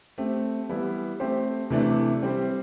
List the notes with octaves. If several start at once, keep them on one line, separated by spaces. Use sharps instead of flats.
A3 C4 G4
E3 G3 B3 E4
A3 C4 G4 C5
C3 E3 A3 D4
G3 C4 G4 C5